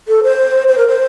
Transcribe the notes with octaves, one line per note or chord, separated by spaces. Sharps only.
A4
C5
C5
A#4
C5